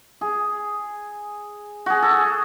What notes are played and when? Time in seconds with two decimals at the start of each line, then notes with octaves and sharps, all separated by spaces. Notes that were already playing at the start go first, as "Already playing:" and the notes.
0.21 G#4
1.86 F#4 G#4
2.02 A4
2.11 G#4